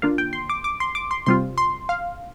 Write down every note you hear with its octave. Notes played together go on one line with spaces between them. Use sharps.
D3 A#3 D4 F4 F5
G5
C6
D6
D6
C6
D6
C6
C3 G3 C4 F4 C6
C6
F5